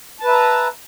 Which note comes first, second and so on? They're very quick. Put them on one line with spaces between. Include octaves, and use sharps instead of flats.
A5 B4 E5 A#5